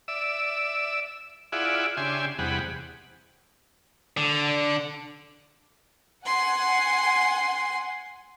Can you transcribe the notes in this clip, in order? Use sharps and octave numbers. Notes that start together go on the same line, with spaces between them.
D5 E5 E6
E4 F4 G#4 D5 E5 F#5
C#3 D4 G4 E5 G#5 C6
E2 C3 G3 G#4 F#5 B5
D3
F#5 G#5 C6